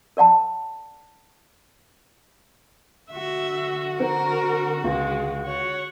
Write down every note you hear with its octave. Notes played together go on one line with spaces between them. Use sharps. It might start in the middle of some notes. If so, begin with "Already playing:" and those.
A#4 D5 F#5 A5
D3 F#4 E5
C4 A#4
C#2 G#3
C#5 F#5